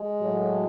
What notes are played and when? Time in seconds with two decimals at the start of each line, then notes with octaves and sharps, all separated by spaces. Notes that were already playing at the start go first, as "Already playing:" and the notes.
Already playing: G#3
0.20 A2 F#3